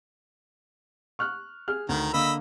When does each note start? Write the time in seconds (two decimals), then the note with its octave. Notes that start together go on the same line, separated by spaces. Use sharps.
1.19 C#6 F6 F#6
1.68 G#4 F6
1.89 D2 D#3 A#5
2.13 D3 A#3 D#5 B5 E6